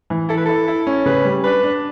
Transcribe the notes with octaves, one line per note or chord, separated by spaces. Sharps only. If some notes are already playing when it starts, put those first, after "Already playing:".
E3
E4 A4
B4
E4 A4
E4
C#4
C#3 B4
G3
D4 B4
D4